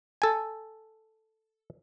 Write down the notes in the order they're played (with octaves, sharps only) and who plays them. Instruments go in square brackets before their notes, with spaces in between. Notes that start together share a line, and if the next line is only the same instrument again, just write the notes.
[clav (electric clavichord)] A4 G#5